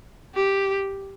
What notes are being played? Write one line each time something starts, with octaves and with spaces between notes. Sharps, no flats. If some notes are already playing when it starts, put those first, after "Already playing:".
G4